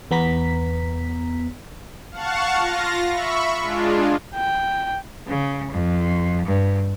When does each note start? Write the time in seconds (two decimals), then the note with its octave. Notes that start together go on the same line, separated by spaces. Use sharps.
0.11 E2 B3 A#5 B6
2.11 F5 F#5 A5 C#6
2.58 F4 F5 A#6
3.10 E5 B5 C#6
3.61 G#3 D4 F4
4.35 G5
5.28 C#3
5.72 F2
6.45 G2